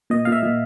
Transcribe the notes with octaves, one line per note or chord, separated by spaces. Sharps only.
A#2 D#5
A#2 F5
E5
A#2